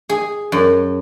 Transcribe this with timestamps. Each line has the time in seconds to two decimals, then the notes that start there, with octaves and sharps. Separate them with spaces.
0.09 G#4
0.52 F#2